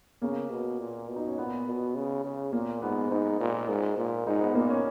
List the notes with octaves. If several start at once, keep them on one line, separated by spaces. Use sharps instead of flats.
C#3 A#3
B2
A#2
B2
D#4
C#4
A#2 B3
B2
C#3
C#3
A#2 A#3
G#2 B3
G#2 D#4
A#2
G#2
A#2
G#2 D#4
B3
A#2 A#3
C#4